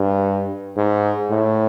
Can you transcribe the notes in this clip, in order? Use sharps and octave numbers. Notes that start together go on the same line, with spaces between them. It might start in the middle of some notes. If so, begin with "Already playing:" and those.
Already playing: G2
G#2
A2